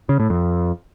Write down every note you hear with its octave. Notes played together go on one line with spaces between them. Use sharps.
C#3
A2
F2